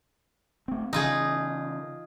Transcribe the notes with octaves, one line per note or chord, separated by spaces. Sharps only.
A3 C4
C#3 E3 C#4 D#4 F4 G#4